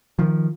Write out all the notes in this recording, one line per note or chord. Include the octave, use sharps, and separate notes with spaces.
D#3 F3